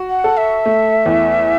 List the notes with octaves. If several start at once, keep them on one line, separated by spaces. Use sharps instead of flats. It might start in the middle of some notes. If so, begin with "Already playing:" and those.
Already playing: F#4
F#5
A4
E5
A3
E2